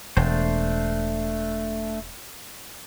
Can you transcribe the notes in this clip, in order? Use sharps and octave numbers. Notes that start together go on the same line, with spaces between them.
E1 A3 D4 C5